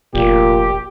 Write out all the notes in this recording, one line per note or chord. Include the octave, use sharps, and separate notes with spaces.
F1 A#2 G4